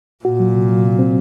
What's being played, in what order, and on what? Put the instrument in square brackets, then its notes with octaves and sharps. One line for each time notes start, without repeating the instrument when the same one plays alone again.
[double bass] A#2 [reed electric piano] F#4
[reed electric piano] F#3
C3
F#3
C3
C4